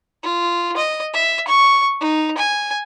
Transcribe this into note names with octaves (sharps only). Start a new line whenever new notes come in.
F4
D#5
E5
C#6
D#4
G#5